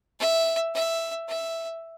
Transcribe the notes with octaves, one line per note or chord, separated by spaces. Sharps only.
E5
E5
E5